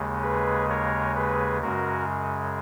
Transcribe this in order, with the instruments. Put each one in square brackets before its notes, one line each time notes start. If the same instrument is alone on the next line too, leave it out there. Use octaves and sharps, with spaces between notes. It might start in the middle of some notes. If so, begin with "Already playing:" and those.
Already playing: [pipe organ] D#2 C#3 G#3
G#4 B4
A#4 C#5
G#4 B4
F#2 C#3 G#3 F#4 A#4